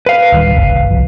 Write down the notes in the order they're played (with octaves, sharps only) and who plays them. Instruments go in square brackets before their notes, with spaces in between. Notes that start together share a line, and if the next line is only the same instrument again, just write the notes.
[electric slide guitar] B4 F5
[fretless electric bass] D1 D#3 G3
F#1 C2
C2 F3